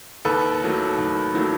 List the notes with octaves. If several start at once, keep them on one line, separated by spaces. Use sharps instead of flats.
D#2 A4 B4
D#3 F#3 A3
D#2
D#3 F#3 A3